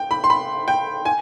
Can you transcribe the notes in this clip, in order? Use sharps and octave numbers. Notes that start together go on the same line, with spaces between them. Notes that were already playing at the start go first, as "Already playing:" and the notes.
Already playing: G5
B5
C6
B5
G5
G#5